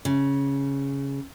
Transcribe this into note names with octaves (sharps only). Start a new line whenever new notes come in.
C#3